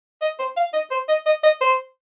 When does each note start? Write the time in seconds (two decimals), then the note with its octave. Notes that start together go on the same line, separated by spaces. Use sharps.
0.22 D#5
0.39 C5
0.57 F5
0.74 D#5
0.91 C5
1.09 D#5
1.26 D#5
1.44 D#5
1.61 C5